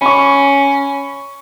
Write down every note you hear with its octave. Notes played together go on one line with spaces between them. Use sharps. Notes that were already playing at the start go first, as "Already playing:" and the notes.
C#4 B5 C#6